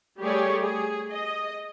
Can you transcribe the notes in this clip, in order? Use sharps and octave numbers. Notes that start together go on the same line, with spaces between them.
G3 A3 G4 G#4 C#5 D5
G#4
D#5